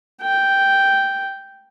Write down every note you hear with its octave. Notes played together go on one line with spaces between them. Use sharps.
G5